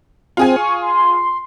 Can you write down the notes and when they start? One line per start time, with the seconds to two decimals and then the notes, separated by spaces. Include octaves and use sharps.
0.37 C4 F4 G#4 G#5
0.56 C#6
0.82 C6